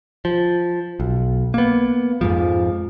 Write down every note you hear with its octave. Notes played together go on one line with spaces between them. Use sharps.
F3
B1
A#3 B3
F2 G#2 F3